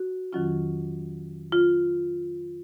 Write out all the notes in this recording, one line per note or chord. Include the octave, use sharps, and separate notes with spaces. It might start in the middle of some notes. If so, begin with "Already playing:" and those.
Already playing: F#4
F2 D#3 F#3 C#4 F4
F4